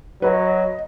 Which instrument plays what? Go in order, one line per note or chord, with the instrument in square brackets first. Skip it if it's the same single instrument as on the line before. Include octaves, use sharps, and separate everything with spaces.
[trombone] F#3 [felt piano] B4 [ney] D#5